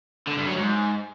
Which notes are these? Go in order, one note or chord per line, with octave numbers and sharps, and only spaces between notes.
D3
G2
F#3
G#2